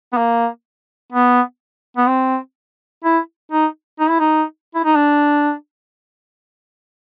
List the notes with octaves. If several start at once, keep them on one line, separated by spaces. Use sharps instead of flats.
B3
A#3
B3
B3
C4
E4
D#4
D#4
E4
D#4
E4
D#4
D4